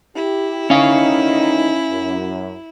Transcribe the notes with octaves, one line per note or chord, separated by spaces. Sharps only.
E4 G4
D2 D#3 C#4 D#4 F5
F#2